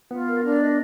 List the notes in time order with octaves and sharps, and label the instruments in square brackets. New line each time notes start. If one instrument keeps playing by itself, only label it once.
[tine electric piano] B3 [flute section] F4
[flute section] A#4
D4
D#5